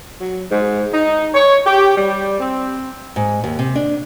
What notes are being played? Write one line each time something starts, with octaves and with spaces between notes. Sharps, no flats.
F#3
G#2
D#4
C#5
G4
G3
C4
G#2
D#2
C3
D4